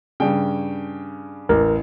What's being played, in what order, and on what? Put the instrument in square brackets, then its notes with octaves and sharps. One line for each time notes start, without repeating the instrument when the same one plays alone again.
[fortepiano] G2 C#3 [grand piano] G5
[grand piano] A1 [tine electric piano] A#4